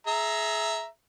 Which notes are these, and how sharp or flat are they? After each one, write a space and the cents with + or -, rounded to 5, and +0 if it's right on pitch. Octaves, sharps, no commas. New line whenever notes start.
G#4 +30 E5 +0 A#5 +0